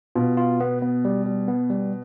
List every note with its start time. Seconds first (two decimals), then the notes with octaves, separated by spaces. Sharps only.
0.15 B2 F4
0.37 F4
0.60 B3
0.82 B3
1.05 G3
1.26 G3
1.48 B3
1.70 G3